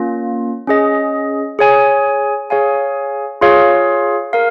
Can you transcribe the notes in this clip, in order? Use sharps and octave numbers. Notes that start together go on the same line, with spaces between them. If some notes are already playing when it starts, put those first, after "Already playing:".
Already playing: A#3 C#4 F4
C#4 G#4 D#5
G#4 C#5 G#5
G#4 C#5 F5 G#5
F4 G#4 C#5 F5
A#4 F5